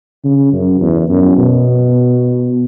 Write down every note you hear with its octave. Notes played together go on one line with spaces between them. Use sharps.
C#3
F#2
E2
F#2
B2